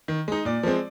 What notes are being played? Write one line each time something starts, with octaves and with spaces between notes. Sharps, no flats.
D#3
G#3 D#4
A#2 D5
F3 G#3 C4